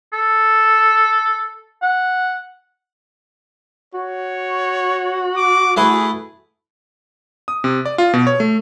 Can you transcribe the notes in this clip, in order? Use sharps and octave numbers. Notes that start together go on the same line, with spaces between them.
A4
F#5
F#4 C#5
D6
A3 E4 G#4 B4
D#6
C3
D5
F4
B2
C#5
A3